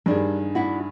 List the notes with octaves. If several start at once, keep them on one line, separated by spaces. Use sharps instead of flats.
G2 D#3 G3 D4 G#4
D4 E4 F#4